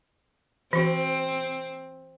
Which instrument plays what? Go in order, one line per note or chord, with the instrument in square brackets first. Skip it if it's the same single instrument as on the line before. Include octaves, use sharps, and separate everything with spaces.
[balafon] E3 F#4 [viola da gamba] C4